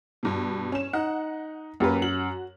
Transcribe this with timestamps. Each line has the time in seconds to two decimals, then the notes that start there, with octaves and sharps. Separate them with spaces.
0.23 G2 B2
0.72 C#4 E7
0.93 D#4 F#5
1.80 F#2 A#3 G4 B4
2.01 F#4 F#7